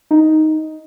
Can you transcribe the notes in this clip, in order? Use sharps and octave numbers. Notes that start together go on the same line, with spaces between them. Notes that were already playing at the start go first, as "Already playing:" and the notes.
D#4